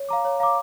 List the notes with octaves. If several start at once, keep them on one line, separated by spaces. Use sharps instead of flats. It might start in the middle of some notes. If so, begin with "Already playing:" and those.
Already playing: C#5
F5 A#5 D6
C#5
F5 A#5 D6